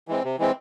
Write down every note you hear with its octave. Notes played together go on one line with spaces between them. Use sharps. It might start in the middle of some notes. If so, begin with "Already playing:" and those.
E3 G#3 C4
C3
E3 G#3 C4